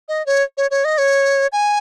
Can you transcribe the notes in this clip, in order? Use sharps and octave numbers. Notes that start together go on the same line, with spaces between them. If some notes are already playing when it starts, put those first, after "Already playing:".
D#5
C#5
C#5
C#5
D#5
C#5
G#5